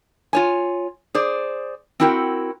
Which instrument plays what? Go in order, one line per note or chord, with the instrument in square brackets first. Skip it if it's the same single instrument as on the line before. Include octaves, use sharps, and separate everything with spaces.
[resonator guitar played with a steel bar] F4 C#5 G#5
G#4 C5 D5
C4 D4 E4 F#4 A#4 G5